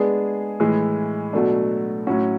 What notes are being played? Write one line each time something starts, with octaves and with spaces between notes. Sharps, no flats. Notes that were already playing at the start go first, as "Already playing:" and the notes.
Already playing: G#3 B3 D4 G#4
A2 E3 G#3
B2 F#3 A3 D4
A2 F#3 C#4 F#4